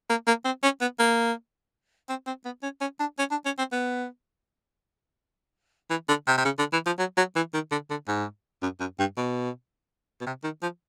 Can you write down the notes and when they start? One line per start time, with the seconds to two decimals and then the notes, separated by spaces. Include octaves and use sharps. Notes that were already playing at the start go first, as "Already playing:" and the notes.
0.10 A#3
0.27 A#3
0.45 C4
0.63 C#4
0.81 B3
0.99 A#3
2.09 C4
2.26 C4
2.45 B3
2.63 C#4
2.81 C#4
3.00 D4
3.18 C#4
3.31 D4
3.45 C#4
3.58 C4
3.72 B3
5.90 E3
6.08 D3
6.27 C3
6.38 C3
6.45 C#3
6.58 D3
6.72 E3
6.86 F3
6.99 F#3
7.17 F#3
7.35 E3
7.54 D#3
7.71 D3
7.90 D3
8.08 G#2
8.62 F#2
8.80 F#2
8.99 G2
9.17 B2
10.21 B2
10.26 C3
10.44 D#3
10.62 F3